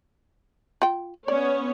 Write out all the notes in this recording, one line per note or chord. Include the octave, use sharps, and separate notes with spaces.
F4 G5
B3 C#4 C#5 D5